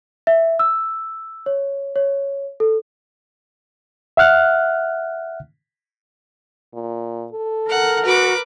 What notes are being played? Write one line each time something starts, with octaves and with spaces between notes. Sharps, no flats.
E5
E6
C#5
C#5
A4
E5 F#5 F6 F#6
A#2
A4
A#4 F#5
F#4 B4 D6